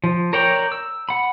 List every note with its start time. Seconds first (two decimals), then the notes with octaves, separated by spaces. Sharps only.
0.04 F3
0.33 A#4 C#5 D5 G5 A#5
0.72 E6
1.09 F#5 B5